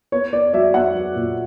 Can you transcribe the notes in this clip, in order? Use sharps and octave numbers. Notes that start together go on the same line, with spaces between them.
B3 C#5
B3 D5
F#3 D5 E5
B3 E5 F#5
F#3
A#2